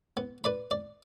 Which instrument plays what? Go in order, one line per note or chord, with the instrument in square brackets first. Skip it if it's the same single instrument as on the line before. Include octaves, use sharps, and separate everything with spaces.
[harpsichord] B3
B4 D5 B5
D5